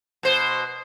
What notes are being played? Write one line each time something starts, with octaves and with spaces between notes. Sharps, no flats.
B2 C5